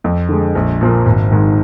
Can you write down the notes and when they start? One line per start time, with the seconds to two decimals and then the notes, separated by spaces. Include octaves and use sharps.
0.04 F2
0.29 D3 G#3
0.55 A#1
0.81 A#2 F3 A#3
1.06 G#1
1.31 G#2 D#3